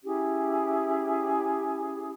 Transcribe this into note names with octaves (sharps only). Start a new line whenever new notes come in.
C#4 E4 G4 G#4